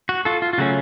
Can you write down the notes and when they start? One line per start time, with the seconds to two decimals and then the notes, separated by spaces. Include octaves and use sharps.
0.09 F#4
0.25 F4 A4
0.42 F4
0.53 F4
0.58 C#3 F#3 A3 C#4 F#4